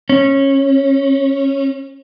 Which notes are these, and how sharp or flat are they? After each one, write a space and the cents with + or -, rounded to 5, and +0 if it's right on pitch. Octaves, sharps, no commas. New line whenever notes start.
C#4 -20